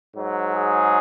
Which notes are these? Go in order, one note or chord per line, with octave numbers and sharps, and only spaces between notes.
G#2 F#3
G#4